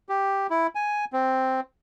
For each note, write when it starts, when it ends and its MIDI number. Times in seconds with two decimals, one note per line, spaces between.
0.09 0.47 67
0.50 0.67 64
0.75 1.05 80
1.13 1.60 60